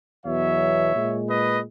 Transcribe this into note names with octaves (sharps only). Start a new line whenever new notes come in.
E2 B2 F#3 C#5 E5
A#2 G#3
B4 D#5